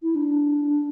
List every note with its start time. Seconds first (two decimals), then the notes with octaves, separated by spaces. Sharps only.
0.03 E4
0.15 D4